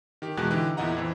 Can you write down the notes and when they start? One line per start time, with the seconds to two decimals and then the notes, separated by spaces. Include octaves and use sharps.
0.22 D#3 G4
0.37 E2 B2 G#3 F#4 F#6
0.50 D3 E3 D#4 G4 F#6
0.77 E2 A#2 E4 D#5 F#5 A#5
0.97 F2 E3 C4